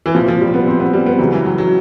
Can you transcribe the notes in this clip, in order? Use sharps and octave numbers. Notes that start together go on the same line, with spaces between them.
E3
C2 A#2 F3
F3
G3
B3
C4
B3
G3
B3
C#2 C#3 E3 F#3
E3
F#3
F#3